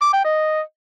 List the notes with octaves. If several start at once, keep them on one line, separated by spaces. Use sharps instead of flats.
D6
G5
D#5